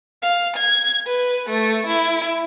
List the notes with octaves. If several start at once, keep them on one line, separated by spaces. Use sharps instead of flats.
F5
G#6
B4
A3
E4